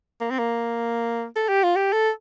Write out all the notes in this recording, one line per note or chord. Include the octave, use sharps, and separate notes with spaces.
A#3
C4
A#3
A4
G4
F4
G4
A4